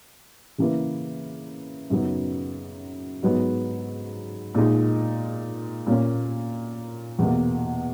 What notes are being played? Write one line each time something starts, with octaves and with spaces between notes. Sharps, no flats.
C#3 E3 A#3 E4 B4
F#2 C#3 F#3 B3 D#4
G#2 F#3 B3
A#2 G#3 D#4
A#2 A#3 C#4
E2 B2 A#3